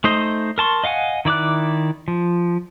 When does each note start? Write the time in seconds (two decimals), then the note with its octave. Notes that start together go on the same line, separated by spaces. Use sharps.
0.04 A3 D#4 C5 D#5
0.58 A#4 A5 C6 C#6
0.84 D#5 F5 F#5 G#5
1.25 D#3 E4 D5 D6 F#6
2.08 F3